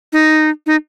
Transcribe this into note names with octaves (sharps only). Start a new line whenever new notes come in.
D#4
D#4